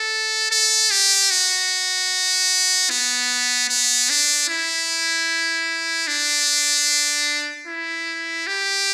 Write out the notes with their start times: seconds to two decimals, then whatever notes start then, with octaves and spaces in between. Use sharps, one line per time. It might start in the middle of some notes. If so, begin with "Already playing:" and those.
Already playing: A4
0.51 A4
0.91 G4
1.31 F#4
2.90 B3
3.69 B3
4.10 D4
4.48 E4
6.07 D4
7.67 E4
8.47 G4